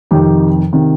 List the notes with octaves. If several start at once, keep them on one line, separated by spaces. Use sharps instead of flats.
F2 C3 D#3 D#4 G4
C3 D#3